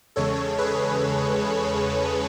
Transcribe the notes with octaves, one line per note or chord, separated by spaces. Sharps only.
E2 C#3 G#3 A4 C#5
G#4 B4